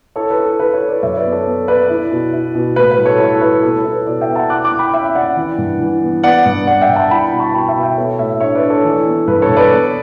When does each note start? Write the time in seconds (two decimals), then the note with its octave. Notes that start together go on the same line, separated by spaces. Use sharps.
0.16 E4 A4 C#5
0.30 B4
0.38 E4
0.45 A4
0.59 E4 B4
0.74 A4 C#5
0.81 E4
0.88 B4 D5
1.02 F#2 C#5 E5
1.17 B4 D5
1.24 B3
1.32 A4 C#5
1.46 B3
1.68 B3 B4 D5
1.89 E4
2.11 B2
2.33 E4
2.55 B2
2.76 A2 B4
2.91 B4
2.98 G3
3.05 A4 C#5
3.20 E4 A4 C#5
3.41 E4 B4
3.63 B2 A4
3.78 B4
3.85 E4
3.92 B4
4.06 B2 B4 D5
4.21 E5 G5
4.28 B3
4.35 F#5 A5
4.50 E4 D6 F#6
4.65 D6 F#6
4.71 E4
4.79 G5 B5
4.93 C#4 E5 G5
5.15 C#4 D5 F#5
5.37 E3
5.58 G2
5.80 E3
6.02 B3
6.23 B3 D5 F#5
6.46 G2
6.67 G2 D5 F#5
6.81 E5 G5
6.89 G2
6.96 F#5 A5
7.10 E4 G5 B5
7.32 B2
7.39 A5 C#6
7.54 B2 G5 B5
7.68 E5 G5
7.76 B2
7.83 E5 G5
7.97 B3 A4 C#5
8.19 A2 C#5 E5
8.40 D4 C#5 E5
8.55 B4 D5
8.62 D4
8.70 A4 C#5
8.84 E3
9.06 B3
9.27 G2 B4
9.42 A4 C#5
9.49 G2
9.56 B4 D5
9.71 B3